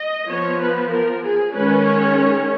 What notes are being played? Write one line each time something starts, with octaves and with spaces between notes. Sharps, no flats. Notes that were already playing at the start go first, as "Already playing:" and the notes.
Already playing: D#5
F3 B3 C#5
B4
A#4
G#4
D#3 G#3 C#4 B4
C#5